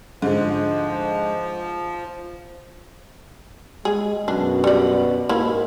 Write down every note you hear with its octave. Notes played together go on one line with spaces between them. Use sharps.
G#2 D3 F3 G#3
G#3 G#4
F#2 B2 D4
G3 D5
G#2 A#3 E4 A#4